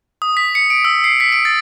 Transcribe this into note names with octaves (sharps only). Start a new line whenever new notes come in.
D#6
B6
C#7
D7
E6
C7
B6
D7
A6